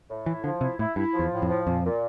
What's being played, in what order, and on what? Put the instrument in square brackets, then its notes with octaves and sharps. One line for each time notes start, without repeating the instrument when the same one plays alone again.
[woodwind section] A2
[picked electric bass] E3 [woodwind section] E4
[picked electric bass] D3 [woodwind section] F3
[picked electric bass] C3 [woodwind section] E4
[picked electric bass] A2 [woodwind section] E4
[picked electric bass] G2 [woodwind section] E4
[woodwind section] F3
[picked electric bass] E2
[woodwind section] A2
[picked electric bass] F2
[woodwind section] F3
[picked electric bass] F2 [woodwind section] A#2
[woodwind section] A#2